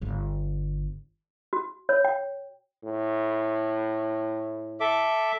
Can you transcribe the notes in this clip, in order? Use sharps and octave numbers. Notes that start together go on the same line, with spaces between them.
G1 D3
F#4
C#5
G5
A2
A4 E5 D6